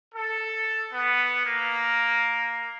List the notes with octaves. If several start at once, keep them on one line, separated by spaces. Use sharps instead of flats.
A4
B3
A#3